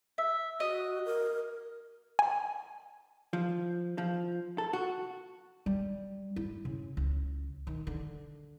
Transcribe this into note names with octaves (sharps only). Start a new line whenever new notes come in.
E5
F#4 D#5
A#4
G#5
F3
F3
A4
F#4
G3
E4
C#3
C#2
D#3
D3